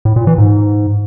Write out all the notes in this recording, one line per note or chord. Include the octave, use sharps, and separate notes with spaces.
A2
A#2
E3
G#2